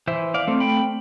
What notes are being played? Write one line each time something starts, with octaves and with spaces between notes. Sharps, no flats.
E3 C5 E5
D5 F5
A3 C4
G5 B5